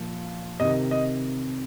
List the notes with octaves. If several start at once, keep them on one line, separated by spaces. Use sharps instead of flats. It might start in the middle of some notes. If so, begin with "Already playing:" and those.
Already playing: A#2 F3
C3 D#3 D#5
D#5